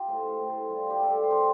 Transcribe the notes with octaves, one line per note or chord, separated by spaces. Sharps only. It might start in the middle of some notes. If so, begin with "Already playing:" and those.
Already playing: F4 G4
A2 A4 C5
C5
G4 A#4
A2
A4 C5
G3 F4
G4
G3 A4
G4
C5
D4 G4 A#4